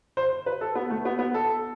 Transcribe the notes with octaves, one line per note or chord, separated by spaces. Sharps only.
C5
B4
A4
B3
A3
B3
B3
A4